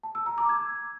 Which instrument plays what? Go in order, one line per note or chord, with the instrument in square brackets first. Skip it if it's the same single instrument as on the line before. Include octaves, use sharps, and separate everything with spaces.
[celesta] A5
E6
A#5
D6
G#6